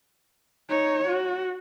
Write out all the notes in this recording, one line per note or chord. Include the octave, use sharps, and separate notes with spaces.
D#4 C#5
F#4